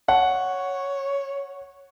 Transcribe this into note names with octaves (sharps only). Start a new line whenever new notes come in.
C#5 F#5